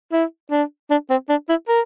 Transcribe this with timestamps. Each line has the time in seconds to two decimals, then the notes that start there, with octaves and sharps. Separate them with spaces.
0.12 E4
0.51 D4
0.91 D4
1.10 C4
1.29 D4
1.49 E4
1.68 A#4